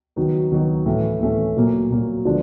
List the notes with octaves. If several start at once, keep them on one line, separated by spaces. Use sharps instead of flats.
D#3 F#3 B3 D#4 F#4
D#3 F#3 B3 D#4 F#4
A2 E3 A3 C#4
A2 E3 A3 C#4
A#2 F#3 A#3
A#2 F#3 A#3
D3 F3 G#3 B3 D4